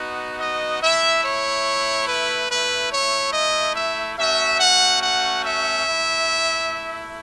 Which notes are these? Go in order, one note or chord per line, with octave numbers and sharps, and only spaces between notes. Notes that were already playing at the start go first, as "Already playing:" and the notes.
Already playing: B3 D#4 F#4
D#5
A3 E4 E5
C#5
B4
A3 E4 B4
C#5
D#5
E5
A3 C#4 F#4 E5
F#5
F#5
E5
A3 E4